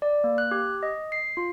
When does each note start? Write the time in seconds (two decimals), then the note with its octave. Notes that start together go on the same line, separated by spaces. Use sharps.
0.02 D5
0.24 A#3
0.38 F#6
0.51 G4
0.83 D#5
1.12 C7
1.37 F4